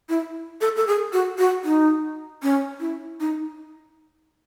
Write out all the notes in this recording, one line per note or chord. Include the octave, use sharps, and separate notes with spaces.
E4
A4
A4
G#4
F#4
F#4
D#4
C#4
E4
D#4